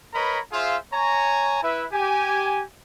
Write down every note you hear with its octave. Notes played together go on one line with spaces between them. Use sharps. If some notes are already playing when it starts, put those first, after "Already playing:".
A#4 B4 C#5 D#5 A#5 B5
F4 G#4 C5 E5 F5
C#5 G#5 A#5
E4 B4 E5
G4 G#5